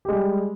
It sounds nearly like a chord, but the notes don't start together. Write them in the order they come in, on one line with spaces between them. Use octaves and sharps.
G4 G#3 G3